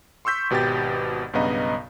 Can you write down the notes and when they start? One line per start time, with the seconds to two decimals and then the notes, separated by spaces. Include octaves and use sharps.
0.25 C6 C#6 E6 G6 B6
0.50 G#1 B2 G4 G5 A6
1.33 B1 G2 C#3 B3 D#5 A#5